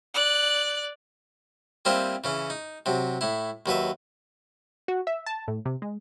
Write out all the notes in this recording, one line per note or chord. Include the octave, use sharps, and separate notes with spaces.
D5 F#6
G3 A#3 C4 E4 F4 C5
C#3 E3 C#4
D#4
C3 F#3
A2 E4
D#2 F#3 B4 E5
F#4
E5
A5
A2
C3
G#3